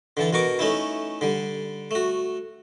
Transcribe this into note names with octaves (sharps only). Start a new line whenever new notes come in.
D3 E3 A4
B2 B3 A#4 C#6 D6
A3 C#4 D#4 E4
D3 G3
A3 F#4